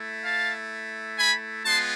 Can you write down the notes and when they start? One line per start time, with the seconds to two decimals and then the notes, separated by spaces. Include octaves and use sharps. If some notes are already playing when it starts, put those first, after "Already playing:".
Already playing: A3 E4
0.25 F5 A5
1.18 G#5 B5
1.65 G#3 B3 F4 A5 C6